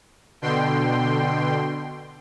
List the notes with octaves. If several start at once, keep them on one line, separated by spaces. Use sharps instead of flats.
B2 D3 G5 C6